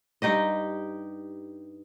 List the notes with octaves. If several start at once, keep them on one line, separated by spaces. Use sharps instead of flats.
G2 D#4 G4 D#5